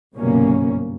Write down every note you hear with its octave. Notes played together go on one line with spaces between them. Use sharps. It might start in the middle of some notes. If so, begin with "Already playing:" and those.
G1 C2 F#2 B2 A#3 C#4